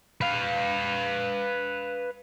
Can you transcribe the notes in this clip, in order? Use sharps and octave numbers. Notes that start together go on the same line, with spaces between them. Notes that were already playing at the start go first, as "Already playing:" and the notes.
B4 F5